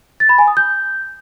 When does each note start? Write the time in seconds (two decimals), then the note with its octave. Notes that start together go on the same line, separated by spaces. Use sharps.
0.20 A6
0.29 B5
0.38 G#5
0.48 D#6
0.57 G6